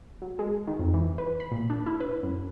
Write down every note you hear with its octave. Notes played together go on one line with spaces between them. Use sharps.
F#3
G#3
D#3
F2
E3
B4
B5
A#2
D4
E4
B4
F#2